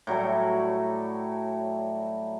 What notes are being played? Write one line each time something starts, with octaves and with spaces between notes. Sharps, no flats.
A2 F#3 G3 A3